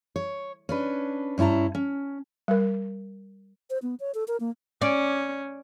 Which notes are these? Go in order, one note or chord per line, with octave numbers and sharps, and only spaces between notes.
C#5
C#4 D4 B4
G2 C#4 E4 A5 A#5
C#4
G3 A#4
C5
B3
C#5
A4
A#4
A#3
C#4 D5